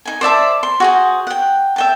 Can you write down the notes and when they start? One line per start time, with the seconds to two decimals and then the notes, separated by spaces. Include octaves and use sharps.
0.05 D#4 G#5
0.21 C5 D5 E5 A5
0.63 C6
0.80 F#4 G#4 C5
1.27 F#5 G5
1.76 E5 G5 A5